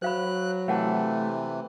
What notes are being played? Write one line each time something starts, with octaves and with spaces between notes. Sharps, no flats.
F#3 C5 F5 B5 F#6
C3 E3 A3 F5 F#5 A5